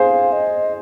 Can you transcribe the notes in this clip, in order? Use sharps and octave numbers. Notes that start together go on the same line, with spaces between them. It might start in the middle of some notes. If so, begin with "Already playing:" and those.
Already playing: G#4 C5 F5
D#5